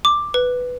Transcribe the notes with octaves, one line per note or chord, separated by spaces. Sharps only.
D6
B4